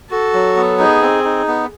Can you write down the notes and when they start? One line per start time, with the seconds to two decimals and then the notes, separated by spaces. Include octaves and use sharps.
0.10 F#4 A4
0.33 F#3
0.56 B3
0.79 D#4 G#4
1.02 C4
1.24 D#4
1.48 B3